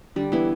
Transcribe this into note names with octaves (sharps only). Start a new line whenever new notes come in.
D3 G3
E3 B3 E4